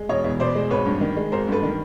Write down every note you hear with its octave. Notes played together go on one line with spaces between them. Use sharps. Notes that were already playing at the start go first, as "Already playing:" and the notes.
Already playing: G#3
E1 C#5 D#5
E2
B2 C5 D5
G#3
G#1 B4 C#5
G2
D#3
G#3
G#1 A#4 C5
G2 A4 B4
D#3